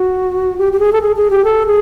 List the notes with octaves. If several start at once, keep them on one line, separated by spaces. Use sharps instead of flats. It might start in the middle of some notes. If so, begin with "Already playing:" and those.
Already playing: F#4
G4
G4
G#4
A4
G#4
G#4
G4
A4
G#4